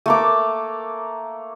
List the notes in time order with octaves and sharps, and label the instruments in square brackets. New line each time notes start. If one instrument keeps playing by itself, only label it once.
[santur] A3 A#3 D6